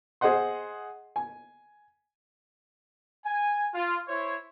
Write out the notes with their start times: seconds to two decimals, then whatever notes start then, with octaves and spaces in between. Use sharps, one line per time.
0.21 G#4 C5 D#5 F#5 C6
1.16 G#5
3.25 G#5
3.74 F4
4.08 E4 C5 C#5